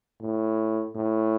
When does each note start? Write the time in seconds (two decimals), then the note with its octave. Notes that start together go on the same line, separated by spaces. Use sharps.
0.21 A2
0.95 A2